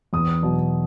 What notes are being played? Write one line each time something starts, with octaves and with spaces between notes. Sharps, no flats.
E2 D#6
B2 F#3